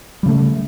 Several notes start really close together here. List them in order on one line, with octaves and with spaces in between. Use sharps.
G3 C#3 A3